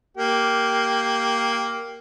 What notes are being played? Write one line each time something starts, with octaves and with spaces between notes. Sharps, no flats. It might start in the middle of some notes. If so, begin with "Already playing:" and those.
A#3 G4